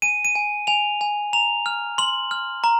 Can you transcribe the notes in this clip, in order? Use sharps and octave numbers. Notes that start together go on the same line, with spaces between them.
G#5 D#7
D#7
G#5
G#5 F7
G#5
A#5 F7
F6
C6 F#7
F6
A#5